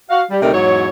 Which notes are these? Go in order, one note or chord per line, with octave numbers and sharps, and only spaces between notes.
F#4 F5
G3
D2 C3 G3 A3 D#4 A#4
E2 G#2 F#3 C#5